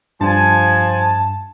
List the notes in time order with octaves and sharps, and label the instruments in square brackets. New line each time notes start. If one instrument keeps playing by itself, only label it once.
[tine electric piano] G2 [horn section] F3 G#5 [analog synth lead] A5